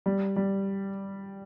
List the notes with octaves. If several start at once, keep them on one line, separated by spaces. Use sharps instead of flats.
G3
G3